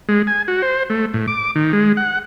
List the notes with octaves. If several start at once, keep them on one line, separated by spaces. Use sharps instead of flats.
G#3
G#5
F#4
C5
A3
A2
D6
D#3
G#3
F#5